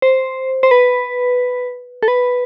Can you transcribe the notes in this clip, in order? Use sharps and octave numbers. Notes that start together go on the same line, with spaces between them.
C5
C5
B4
A4
B4